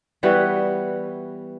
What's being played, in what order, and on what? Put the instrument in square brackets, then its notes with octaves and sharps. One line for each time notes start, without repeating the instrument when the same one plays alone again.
[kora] E3 G3 B3 F#4